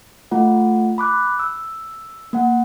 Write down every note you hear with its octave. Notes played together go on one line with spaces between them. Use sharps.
A3 F4 F#5
B5 D6 F#6
E6
A#3 F#5